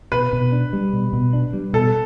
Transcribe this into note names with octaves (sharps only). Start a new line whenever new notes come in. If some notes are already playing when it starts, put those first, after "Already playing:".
B2 B4
B2
D4
G3
B2
B2
D4
G3
B2 A4